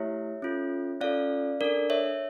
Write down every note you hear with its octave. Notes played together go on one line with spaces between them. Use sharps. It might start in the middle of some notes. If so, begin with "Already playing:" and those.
Already playing: A3 E4 G4 C#5 E5
C#4 F4 A4
C#4 F4 A4 D5 F5
D4 A4 A#4 D5
C#5 E5